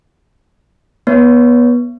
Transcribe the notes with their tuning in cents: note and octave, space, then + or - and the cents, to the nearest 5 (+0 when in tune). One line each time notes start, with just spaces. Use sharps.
B3 -25 C#5 +15